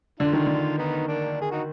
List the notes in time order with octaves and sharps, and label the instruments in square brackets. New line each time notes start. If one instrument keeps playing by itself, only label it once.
[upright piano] D3 [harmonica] D4 F4
[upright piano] D#3
D3
[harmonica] B3 D#4
A#3 D4
G#4
D#4 F#4